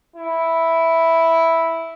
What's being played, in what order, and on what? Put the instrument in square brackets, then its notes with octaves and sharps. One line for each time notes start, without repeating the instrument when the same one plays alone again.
[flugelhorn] E4